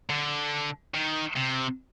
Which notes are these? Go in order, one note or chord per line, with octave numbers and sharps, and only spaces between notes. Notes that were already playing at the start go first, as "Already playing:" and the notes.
D3
D#3
C3